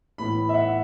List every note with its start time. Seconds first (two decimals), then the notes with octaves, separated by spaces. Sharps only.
0.18 A2 E3 B3 B5
0.49 E5
0.54 F#5